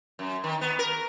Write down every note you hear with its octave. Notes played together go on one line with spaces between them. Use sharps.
F#2
D#3
B3
A#4